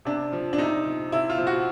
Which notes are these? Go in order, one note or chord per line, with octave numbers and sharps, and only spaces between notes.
C3 D4
F3
D4
C3 D#4
F3
C3 E4
F4
F3
F#4